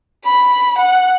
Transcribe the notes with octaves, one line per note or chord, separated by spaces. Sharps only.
B5
F#5